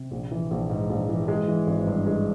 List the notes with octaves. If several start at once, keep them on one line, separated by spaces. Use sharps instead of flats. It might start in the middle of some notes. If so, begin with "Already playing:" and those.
Already playing: C3
A#1
E3
A#1
G#2
A#1
E3
G#3
E3
G#1
G2
G#3